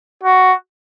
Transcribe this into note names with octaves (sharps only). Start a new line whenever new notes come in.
F#4